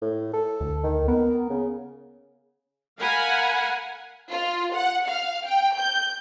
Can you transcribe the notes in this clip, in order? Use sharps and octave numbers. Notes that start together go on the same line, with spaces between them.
A2
A4
D2
D#3
B3 A#4
C#3
A#4 F5 F#5 G#5 B5
F4
F#5
F5
G5
G6